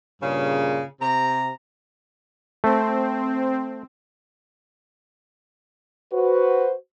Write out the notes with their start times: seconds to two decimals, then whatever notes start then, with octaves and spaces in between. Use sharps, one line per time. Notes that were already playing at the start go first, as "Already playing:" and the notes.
0.22 G2 A#2 C#3
1.01 C3 A#5
2.64 A3 C4
6.13 F#4 B4 C5